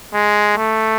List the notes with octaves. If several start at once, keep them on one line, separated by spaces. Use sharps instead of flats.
G#3
A3